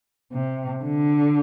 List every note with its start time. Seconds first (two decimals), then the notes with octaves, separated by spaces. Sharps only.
0.33 C3
0.83 D3